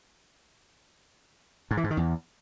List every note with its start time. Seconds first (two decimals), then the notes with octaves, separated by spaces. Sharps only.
1.71 G#2
1.77 E3
1.84 G#2
1.90 D#3
1.97 E2